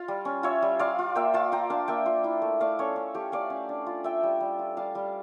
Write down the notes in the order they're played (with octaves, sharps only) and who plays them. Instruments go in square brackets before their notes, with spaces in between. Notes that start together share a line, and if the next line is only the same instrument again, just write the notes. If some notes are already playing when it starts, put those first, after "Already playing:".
Already playing: [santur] F4 F5
G3
C#4
F4 C#5 E5
G3
F4 D5 F5
F4
A#3 E5 G5
F4 F5 A5
F4 G5 A#5
D4 F5 A5
A#3 E5 G5
F4
E4
A3
A3 D5 F5
C#4 A4 C#5
C#4
A3 G4
A3 D5 F5
C#4
D4
F4
F4 E5 G5
G3
G3
F4
G3 F5 A5
G3